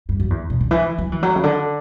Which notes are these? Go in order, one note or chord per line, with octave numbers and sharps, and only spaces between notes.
G2
F#2
E2
B2
D3
E3
F#3
E3
F#3
C#3
D3